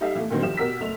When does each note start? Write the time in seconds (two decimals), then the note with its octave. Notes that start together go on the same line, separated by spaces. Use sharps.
0.01 G3 D#4 G4 A4 E5 F5
0.15 E3 A3
0.30 A#2 D3 D#3 F#3 C4
0.42 G1 D#3 F3 G4 E5 E7
0.57 B2 G4 A#4 F#5 E6 B6
0.80 F#1 A3 F7